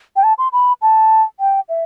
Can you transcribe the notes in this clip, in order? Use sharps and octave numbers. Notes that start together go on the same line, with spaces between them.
G5
A5
C6
B5
A5
G5
E5